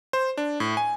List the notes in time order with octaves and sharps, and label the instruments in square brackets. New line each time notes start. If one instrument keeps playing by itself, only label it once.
[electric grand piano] C5
D4
A2
G#5